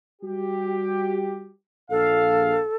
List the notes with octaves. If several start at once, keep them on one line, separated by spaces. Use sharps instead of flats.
G3 F#4 G4
A#1 A4 F5